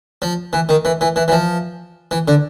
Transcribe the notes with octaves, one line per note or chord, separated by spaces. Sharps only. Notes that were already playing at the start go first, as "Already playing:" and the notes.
F3
E3
D#3
E3
E3
E3
E3
F3
E3
D3